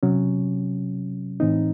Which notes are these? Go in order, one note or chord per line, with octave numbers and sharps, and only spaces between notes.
C3 F#3 C#4
A2 E3 C4 D#4